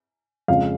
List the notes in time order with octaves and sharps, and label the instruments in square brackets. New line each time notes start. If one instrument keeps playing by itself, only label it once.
[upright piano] F2 C#3 G#3 F5